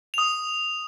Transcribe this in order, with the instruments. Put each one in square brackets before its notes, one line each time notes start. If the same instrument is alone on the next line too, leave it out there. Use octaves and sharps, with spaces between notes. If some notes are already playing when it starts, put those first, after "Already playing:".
[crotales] D#6 F7